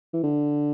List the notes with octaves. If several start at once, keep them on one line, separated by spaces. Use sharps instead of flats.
E3
D3